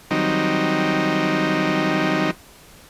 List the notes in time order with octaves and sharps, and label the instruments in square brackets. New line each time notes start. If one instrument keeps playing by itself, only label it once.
[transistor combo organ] D#3 F#3 G3 C4 D#4